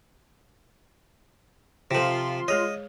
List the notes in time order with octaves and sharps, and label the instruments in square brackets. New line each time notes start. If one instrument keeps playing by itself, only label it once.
[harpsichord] C3 F3 [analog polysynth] F4 C6 [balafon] A4 C5
[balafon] G#3 G#4 C#5 [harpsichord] D#5